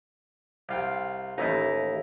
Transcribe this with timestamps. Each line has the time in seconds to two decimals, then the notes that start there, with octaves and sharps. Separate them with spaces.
0.69 C2 F4 G5
1.38 A1 D#2 D#4 E4 D#5